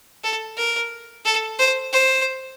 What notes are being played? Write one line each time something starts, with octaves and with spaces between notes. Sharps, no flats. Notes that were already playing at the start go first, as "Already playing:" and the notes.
A4
A#4
A4
C5
C5